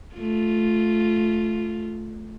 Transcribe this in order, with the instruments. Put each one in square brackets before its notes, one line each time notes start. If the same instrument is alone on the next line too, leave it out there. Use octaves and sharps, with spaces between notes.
[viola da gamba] A3 F4